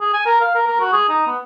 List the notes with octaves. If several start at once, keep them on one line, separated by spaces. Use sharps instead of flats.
G#4
G#5
A#4
F5
A#4
A#4
F#4
G#4
D#4
B3